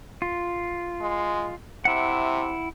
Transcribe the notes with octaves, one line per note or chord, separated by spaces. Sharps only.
F4
G#3
C3 E4 F#5